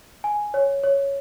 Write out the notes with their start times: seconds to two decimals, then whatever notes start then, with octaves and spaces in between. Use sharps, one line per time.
0.24 G#5
0.54 C#5
0.84 C#5